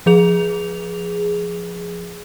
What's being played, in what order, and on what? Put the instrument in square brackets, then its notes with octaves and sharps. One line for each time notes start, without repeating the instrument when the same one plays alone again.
[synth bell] F3 G#4 F7